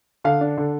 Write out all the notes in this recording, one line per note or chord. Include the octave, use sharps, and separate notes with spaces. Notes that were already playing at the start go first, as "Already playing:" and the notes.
D3 F5
D4
D3